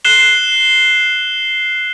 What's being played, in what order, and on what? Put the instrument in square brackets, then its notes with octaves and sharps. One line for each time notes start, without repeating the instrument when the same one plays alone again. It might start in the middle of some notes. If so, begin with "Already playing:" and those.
[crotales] F#6 C7 E7 G7